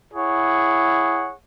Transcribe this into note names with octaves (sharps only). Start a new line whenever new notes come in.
E4 G#4 C#5 F#5